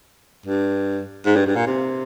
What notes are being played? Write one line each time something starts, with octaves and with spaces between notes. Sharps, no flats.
G2
G#2
G2
G2
A#2
C3